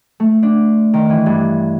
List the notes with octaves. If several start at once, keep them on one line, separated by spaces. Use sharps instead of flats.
A3
D4
D#3
E3
G2